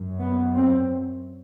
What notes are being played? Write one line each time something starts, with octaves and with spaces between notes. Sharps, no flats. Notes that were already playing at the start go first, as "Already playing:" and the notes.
Already playing: F#2
B3
C4